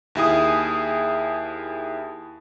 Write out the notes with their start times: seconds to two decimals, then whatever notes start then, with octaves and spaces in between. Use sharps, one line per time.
0.15 D#2 E4 G#4 D#6